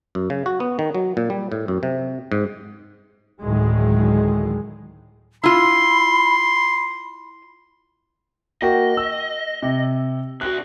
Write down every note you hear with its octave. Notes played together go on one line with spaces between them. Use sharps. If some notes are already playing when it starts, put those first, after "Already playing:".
F#2
C#3
F#4
B3
D#3
F#3
A#2
G3
A2
F#2
C3
G#2
D2 A2 D#3 F#3 G#3
E4 F4 B5 C6
A#3 F#4 D#5 G5
E6
C3
D2 F#4 F#6